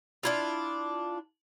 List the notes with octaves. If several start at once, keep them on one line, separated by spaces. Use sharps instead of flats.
D4 E4 F4